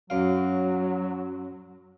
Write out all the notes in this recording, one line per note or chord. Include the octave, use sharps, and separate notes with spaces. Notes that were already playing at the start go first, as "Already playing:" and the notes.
F#2 F#3 F5